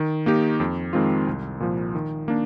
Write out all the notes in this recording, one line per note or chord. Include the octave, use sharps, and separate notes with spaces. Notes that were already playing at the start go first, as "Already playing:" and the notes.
Already playing: D#3
A#3 D#4 G4
F2
D#3 G#3 C4 F4
C2
A#2 F3
D#3
A#3 D4